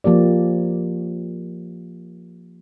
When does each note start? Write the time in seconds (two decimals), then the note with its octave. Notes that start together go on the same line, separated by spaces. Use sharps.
0.04 F3 A#3 G4 D5